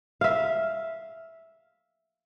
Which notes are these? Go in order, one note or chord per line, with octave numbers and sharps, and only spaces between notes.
E5 F5